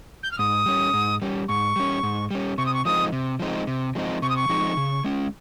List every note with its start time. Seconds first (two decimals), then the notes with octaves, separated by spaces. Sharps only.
0.23 G6
0.32 F6
0.39 G#2 D#6
0.66 G3 C#4
0.94 G#2
1.22 G3 C#4
1.48 G#2 C#6
1.76 G3 C#4
2.03 G#2
2.31 G3 C#4
2.58 C3 C#6
2.66 D#6
2.74 C#6
2.85 F3 G#3 C4 D#4 D#6
3.12 C3
3.40 F3 G#3 C4 D#4
3.67 C3
3.95 F3 G#3 C4 D#4
4.22 C3 C#6
4.29 D#6
4.36 C#6
4.49 F3 G#3 C4 D#4
4.77 C#3
5.04 G#3 C#4